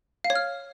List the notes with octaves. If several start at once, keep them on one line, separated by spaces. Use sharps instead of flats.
F5
C#5
F6